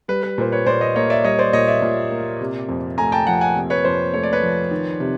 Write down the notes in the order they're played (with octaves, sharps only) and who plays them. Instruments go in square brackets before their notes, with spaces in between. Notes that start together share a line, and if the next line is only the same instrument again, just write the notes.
[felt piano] G3 [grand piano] B4
[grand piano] B4
[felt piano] A#2 [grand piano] C5
[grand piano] B4 C#5
[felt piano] A#2 [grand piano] C5 D5
[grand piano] C#5 D#5
[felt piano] A#3 [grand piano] C#5 D#5
[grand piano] D5 E5
[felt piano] G3 [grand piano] C#5 D#5
[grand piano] C5 D5
[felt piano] A#2 [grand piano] C#5 D#5
[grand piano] D5 E5
[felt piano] A#2
A#3
C3
F2
[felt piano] A3 [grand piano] G#5 A#5
[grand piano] G5 A5
[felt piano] F3 [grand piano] F#5 G#5
[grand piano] F#5 G#5
[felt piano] C3
[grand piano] B4 C#5
[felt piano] F2 [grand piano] C5
[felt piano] A3 [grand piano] C#5
[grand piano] D5
B4 C#5
[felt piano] F3
D#3
C3